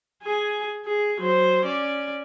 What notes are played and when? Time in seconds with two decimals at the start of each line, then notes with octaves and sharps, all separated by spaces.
0.23 G#4 G#5
0.85 G#4
1.21 F#3 C5
1.65 C#4 D5